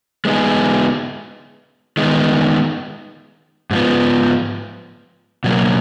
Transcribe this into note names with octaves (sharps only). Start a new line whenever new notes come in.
G#3 B3 D#4 G#4
D#3 G#3 B3 D#4
G#2 F3 B3
B2 F#3 A#3